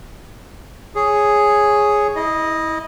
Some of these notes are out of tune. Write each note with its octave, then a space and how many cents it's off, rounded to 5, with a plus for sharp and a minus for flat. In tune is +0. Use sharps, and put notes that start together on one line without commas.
G#4 +0 C#5 +0
E4 -30 D#5 +0